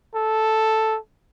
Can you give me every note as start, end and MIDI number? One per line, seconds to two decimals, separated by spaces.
0.15 0.98 69